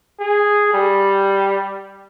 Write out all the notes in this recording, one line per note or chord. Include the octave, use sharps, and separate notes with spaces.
G#4
G3